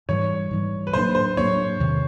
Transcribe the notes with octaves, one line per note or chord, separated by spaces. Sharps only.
G#2 E3 G3 C#5
G#2 E3 G3
B4
A2 F#3 A#3 D4 C5
C5
A2 F#3 A#3 D4 C#5
E2 C3 D#3